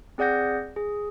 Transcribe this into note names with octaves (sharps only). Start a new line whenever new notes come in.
C4 G#4 D5 F#5 G6 A#6
G#4